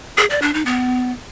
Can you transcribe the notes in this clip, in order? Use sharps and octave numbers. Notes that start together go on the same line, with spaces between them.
G#4
D5
D4
D#4
B3